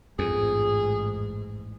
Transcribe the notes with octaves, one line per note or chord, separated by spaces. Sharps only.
A1 F2 G#2 G#4